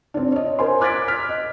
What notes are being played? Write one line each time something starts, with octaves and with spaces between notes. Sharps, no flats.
C4 D4
C#5 D#5
A#4 C5 G#5 C6
D6 F#6 G#6 A6 B6 D7
F6 B6
D#5